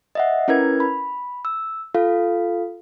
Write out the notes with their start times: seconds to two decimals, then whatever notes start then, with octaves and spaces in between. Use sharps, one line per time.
0.15 D#5 E5 F#5
0.48 C#4 E4 A#4 B4 G#6
0.80 B5
1.45 E6
1.95 F4 A4 F5